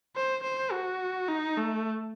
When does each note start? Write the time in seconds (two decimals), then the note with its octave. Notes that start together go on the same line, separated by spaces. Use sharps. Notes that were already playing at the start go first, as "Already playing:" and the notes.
0.16 C5
0.44 C5
0.72 F#4
1.28 D#4
1.57 A3